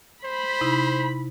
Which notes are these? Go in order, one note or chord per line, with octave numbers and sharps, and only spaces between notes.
C5 B5
C3 D#4 E4